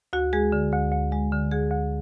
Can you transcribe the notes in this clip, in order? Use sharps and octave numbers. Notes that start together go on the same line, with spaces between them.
D2 F#4
G#3 G#4
D3
D2
D2
G#3
D3
D2 G#4
D2